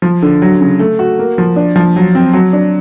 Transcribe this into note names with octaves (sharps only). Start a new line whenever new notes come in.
F3
D3
F#3
C#3
A3
F#4
A#3
F3
D4
F3
F#3
C4
F#3
D4